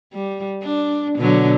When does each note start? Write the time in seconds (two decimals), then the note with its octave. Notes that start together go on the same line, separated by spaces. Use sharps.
0.14 G3
0.63 D4
1.17 B2 D3 F#3